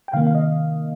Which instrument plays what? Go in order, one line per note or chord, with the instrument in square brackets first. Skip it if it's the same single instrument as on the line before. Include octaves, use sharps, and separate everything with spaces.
[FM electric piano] G5
C3 D#3 A#3 F5
F5
D#5